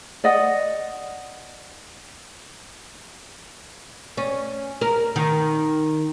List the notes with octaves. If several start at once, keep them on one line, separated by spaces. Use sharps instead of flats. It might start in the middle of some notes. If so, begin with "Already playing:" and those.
D5 D#5 F#5
C#4
A#4
D#3